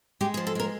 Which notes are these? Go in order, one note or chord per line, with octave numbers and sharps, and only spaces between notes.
G#3 G4
G#4
F3
A4
G#3 A#4